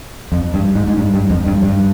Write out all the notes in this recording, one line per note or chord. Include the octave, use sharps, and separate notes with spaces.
F2
G2
G#2
G#2
G2
G2
F2
G2
G2